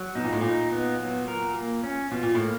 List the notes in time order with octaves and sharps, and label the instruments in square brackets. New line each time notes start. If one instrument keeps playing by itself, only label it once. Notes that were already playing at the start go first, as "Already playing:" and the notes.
Already playing: [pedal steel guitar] F#3
[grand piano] B2 [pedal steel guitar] D#4
[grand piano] A#2
A2
[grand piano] A#2 [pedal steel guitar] D#4
[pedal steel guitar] B3
F#3
A#4
A#3
C#4
[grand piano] B2 [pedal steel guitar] F4
[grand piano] A#2
[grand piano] A2 [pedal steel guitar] A#3